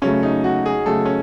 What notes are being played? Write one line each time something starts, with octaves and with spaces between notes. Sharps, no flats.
C#3 F#3 A3 C#4
D#4
F#4
G#4
C#3 F#3 A3 A4
C#4